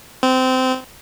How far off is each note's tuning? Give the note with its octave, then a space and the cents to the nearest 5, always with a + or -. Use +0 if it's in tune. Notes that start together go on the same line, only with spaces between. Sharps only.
C4 -20